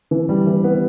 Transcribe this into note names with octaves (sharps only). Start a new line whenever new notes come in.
E3
G3
E3
B3